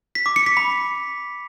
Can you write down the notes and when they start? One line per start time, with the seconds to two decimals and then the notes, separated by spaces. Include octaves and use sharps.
0.15 B6
0.26 D6
0.36 C#7
0.46 B6
0.57 B5